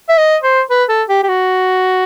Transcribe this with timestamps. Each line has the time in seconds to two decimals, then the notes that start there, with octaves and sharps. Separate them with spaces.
0.09 E5
0.18 D#5
0.43 C5
0.70 B4
0.89 A4
1.08 G4
1.23 G4
1.29 F#4